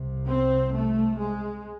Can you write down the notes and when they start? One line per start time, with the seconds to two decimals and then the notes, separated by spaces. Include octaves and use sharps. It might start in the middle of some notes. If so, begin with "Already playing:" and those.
Already playing: C2 C3
0.27 C4
0.72 A3
1.17 G#3